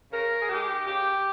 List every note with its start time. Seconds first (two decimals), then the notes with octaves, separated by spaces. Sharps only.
0.12 C#3 A#4
0.41 G#4
0.49 G#3 D#4 G4
0.86 C#3 G4